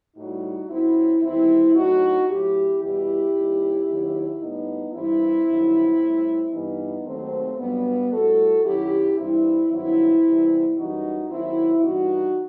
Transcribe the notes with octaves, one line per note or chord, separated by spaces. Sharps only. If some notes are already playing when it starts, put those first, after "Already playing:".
A2 G3 D#4 F#4
F#2 F#3 C4 E4
E2 D#3 G3 C4 E4
A2 F#3 D#4 F#4
A2 F#3 E4 G4
E2 B2 G3 E4 G4
D#2 D#3 G3
D#2 D#3 F#3
A2 G3 B3 D#4
G2 E3 G3 C4 E4
G2 D#3 F#3
A2 G3
G2 E3 G3 B3 D#4
D#2 D#3 F#3 A3 C4
G2 F#3 G3 B3
A2 G3 F#4 A4
F#2 D#3 F#3 E4 G4
G2 E3 G3 C4 E4
G2 D#3 F#3 C4 E4
E2 C3 E3 G3
F#2 E3 G3 D#4 F#4
D#2 D#3 F#3 C4 E4
G2 E3 G3 D#4 F#4